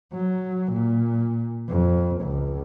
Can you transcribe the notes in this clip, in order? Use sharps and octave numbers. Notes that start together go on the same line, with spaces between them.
F#3
A#2
F2
C#2